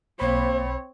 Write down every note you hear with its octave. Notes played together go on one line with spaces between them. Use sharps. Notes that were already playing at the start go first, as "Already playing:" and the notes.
B1 A#3 C4 C5 C#5 B5